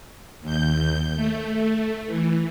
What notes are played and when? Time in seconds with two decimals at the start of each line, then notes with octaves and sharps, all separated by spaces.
0.41 D#2 G6
1.16 A3
2.07 E3